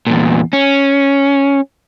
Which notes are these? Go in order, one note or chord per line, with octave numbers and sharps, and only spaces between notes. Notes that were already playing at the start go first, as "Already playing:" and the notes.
E2 A#2
C#4